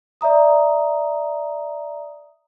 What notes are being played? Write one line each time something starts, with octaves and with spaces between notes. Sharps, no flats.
D5 E5 A#5 D#6